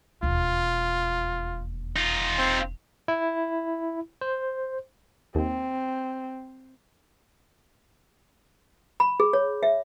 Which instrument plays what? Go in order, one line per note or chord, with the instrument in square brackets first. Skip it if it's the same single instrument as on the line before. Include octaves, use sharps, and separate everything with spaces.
[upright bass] E1 D#2 [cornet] F4
[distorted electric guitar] D#4 F4
[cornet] C4
[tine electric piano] E4
C5
[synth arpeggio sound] D#2 [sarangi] C4
[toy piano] B5
G#4
C#5
E5